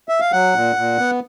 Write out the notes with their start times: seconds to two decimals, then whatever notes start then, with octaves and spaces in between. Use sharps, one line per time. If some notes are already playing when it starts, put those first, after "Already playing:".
0.09 E5
0.20 F5
0.32 F#3 F#5
0.54 A#2
0.76 A#2
0.98 B3